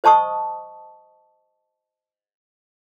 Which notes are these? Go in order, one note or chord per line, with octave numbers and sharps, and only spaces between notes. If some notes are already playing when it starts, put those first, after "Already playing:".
C5 D#5 A5 C#6 D#6